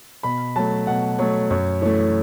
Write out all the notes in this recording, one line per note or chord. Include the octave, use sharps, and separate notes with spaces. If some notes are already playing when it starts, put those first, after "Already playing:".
B2 B5
F#3 A3 A5
B2 F#5
F#3 A3 C#5
F#2 C#5
E3 A3 C#5